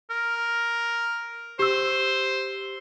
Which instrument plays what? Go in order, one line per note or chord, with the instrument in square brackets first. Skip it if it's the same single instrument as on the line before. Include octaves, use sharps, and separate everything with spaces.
[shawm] A#4
[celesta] G4 E6 [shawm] C5